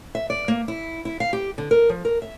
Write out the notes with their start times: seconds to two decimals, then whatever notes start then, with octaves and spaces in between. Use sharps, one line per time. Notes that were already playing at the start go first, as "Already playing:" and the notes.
0.15 E5
0.30 D5
0.48 A#3
0.68 E4
1.05 E4
1.20 F5
1.33 G4
1.58 D3
1.71 A#4
1.89 F3
2.05 A#4
2.22 E5